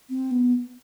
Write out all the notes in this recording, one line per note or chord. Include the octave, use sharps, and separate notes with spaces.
C4
B3